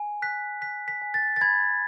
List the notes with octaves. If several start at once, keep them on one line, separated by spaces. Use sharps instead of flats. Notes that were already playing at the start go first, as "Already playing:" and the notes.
Already playing: G#5
F#6 B6
F#6 B6
B6
G#5
A6
A6
B5 G#6